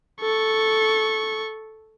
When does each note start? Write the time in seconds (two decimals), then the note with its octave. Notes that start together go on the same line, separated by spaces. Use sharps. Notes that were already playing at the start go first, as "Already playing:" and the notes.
0.20 A4 C#6